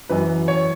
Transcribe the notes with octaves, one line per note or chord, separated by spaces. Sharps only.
F#2 E3 B4
C#5